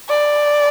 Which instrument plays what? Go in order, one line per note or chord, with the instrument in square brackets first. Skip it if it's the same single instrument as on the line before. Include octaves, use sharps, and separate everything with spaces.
[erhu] D5